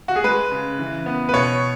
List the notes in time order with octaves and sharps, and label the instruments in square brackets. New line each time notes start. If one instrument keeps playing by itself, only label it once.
[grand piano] F#4
G#4
G#3 B4
C#3
E3
B3
B4
B2 C#5